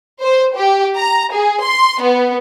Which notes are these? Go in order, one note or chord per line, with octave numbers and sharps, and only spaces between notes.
C5
G4
A#5
G#4
C6
B3